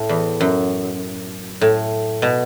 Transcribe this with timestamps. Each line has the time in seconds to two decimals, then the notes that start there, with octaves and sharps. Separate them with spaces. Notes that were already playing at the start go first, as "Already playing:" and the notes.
Already playing: A2
0.09 E2
0.40 F#2
1.61 A2
2.22 B2